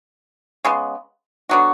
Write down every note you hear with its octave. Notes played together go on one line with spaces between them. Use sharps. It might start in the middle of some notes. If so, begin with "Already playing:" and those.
C#3 G#3 B3
D3 F#3 B3 F#4